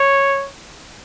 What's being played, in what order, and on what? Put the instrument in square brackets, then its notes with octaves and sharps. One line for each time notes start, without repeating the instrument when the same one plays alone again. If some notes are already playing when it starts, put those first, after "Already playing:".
Already playing: [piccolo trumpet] C#5